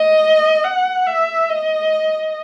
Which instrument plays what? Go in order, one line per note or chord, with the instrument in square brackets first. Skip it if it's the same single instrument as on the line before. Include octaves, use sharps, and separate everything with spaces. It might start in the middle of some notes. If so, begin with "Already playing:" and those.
Already playing: [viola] D#5
F#5
E5
D#5